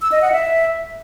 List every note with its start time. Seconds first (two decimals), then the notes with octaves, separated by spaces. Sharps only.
0.02 E6
0.12 D#5
0.22 F#5
0.32 E5